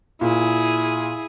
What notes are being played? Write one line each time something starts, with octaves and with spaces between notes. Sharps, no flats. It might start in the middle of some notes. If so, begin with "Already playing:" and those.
A#2 E4 G#4